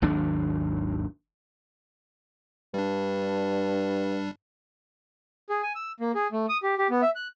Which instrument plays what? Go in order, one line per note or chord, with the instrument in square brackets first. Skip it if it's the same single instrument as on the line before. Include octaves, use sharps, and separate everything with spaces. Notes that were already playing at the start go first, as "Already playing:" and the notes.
[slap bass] G#1 D#2 F#3 D4
[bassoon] G2 [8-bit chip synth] G3 D4
[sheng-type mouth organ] G#4
G#5
E6
A#3
G#4
A3
D#6
G4
G4
B3
E5
F#6